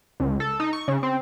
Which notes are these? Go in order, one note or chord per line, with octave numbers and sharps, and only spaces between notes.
C#2
A4
D#4
C#6
C#3
C4